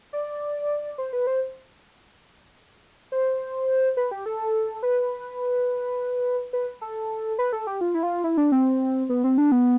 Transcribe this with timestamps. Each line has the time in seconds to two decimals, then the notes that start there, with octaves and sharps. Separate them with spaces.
0.13 D5
0.98 C5
1.13 B4
1.27 C5
3.12 C5
3.97 B4
4.11 G4
4.26 A4
4.83 B4
6.53 B4
6.81 A4
7.39 B4
7.53 A4
7.67 G4
7.81 F4
7.94 E4
8.03 F4
8.24 E4
8.37 D4
8.52 C4
9.09 B3
9.24 C4
9.38 D4
9.52 B3